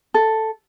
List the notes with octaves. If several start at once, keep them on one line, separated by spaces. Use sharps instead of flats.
A4